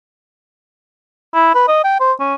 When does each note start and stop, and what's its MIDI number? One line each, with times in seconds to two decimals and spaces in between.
1.34 1.50 64
1.55 1.64 71
1.68 1.80 75
1.84 1.99 79
2.00 2.12 72
2.20 2.34 61